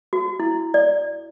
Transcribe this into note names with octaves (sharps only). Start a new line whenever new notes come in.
F#4
E4
D5